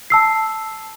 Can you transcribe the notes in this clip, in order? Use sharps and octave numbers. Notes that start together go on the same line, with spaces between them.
A5 E6 C7